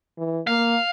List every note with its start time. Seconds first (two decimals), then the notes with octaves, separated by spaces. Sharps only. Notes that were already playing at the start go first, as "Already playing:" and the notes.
0.18 E3
0.47 A#3 F5